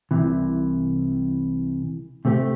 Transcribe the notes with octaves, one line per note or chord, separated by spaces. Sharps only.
C2 C3 E3
C3 A3 C4 G4